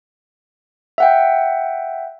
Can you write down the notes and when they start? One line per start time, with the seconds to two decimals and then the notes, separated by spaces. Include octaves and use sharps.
0.98 E5 F#5 G5